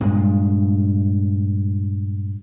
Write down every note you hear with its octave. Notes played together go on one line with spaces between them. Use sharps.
G2 A#2 G#3